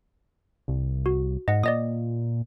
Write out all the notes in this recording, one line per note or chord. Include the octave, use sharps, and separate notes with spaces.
C2
F#4
G#2 D#5 F#5
A#2 D5 D#5 D#6